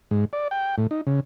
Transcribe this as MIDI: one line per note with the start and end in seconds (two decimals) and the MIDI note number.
0.11 0.25 44
0.33 0.48 74
0.51 0.76 79
0.78 0.87 45
0.91 1.01 63
1.07 1.20 49